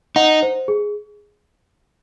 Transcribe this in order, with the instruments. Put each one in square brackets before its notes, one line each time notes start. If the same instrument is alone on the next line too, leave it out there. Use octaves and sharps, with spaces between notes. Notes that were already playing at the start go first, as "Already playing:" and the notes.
[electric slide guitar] D#4 [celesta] F#5
[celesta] C5
G#4